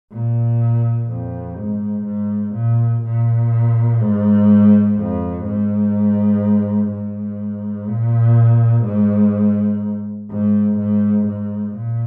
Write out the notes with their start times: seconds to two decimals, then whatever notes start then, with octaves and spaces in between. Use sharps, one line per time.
0.12 A#2
1.09 F2
1.57 G#2
2.06 G#2
2.54 A#2
3.03 A#2
4.00 G#2
4.97 F2
5.45 G#2
6.91 G#2
7.88 A#2
8.85 G#2
10.30 G#2
10.79 G#2
11.27 G#2
11.76 A#2